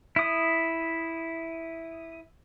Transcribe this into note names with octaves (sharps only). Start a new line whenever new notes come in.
E4 D#6